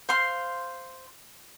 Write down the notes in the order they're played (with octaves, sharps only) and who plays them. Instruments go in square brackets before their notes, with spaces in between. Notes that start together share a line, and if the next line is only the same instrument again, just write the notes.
[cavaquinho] C5 F5 C6